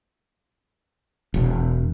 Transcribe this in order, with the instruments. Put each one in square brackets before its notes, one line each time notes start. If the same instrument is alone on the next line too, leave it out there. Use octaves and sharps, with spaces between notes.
[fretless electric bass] E1